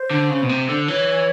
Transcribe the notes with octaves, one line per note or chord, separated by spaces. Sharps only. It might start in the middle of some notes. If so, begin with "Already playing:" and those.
Already playing: C5
D3
C#3
B2
C3
D3
E3 C#5